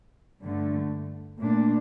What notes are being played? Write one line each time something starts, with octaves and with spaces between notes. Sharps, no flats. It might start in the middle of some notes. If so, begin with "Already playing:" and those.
G2 D3 A3
A#2 A3 D4